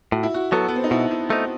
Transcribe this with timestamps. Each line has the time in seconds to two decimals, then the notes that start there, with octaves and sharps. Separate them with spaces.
0.12 A2 F#4
0.23 E4
0.34 F#4
0.52 F#3 B3 A4
0.68 B3
0.76 C4
0.84 D#4
0.91 B2 E4
1.11 E4
1.30 A3 C4 D#4